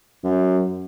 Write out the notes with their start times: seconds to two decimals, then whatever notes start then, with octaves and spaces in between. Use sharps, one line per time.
0.24 F#2